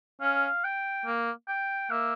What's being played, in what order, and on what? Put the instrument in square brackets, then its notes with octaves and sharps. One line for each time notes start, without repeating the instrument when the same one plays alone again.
[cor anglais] C#4 [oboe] F5
[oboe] G5
[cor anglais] A#3
[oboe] G5
[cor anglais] A#3 [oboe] E5